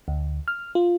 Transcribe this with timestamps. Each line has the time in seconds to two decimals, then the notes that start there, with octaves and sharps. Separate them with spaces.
0.08 D2
0.48 F6
0.75 F4